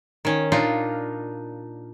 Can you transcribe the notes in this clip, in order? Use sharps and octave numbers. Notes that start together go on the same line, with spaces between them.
D#3 C#4
A#2 D4 D#4 F4